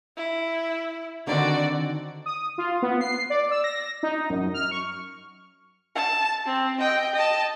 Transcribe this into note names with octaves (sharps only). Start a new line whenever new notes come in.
E4
D3 D#3 C4 F#4 D5
D#6
F4
B3
C7
D5
E6
A#6
D#4
F#2
F6
C#6
A5
C4
D#5 G5
D#5 A5